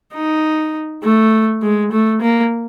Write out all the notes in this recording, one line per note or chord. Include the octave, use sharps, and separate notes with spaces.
D#4
A3
G#3
A3
A#3